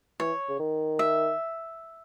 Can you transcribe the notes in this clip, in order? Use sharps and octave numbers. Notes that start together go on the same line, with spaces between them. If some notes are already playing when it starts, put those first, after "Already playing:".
E3 C#5
C#3
D#3
E5